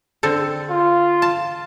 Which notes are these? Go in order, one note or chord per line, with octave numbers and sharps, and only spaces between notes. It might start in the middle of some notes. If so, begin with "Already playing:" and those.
D3 C4 A4
F4
A5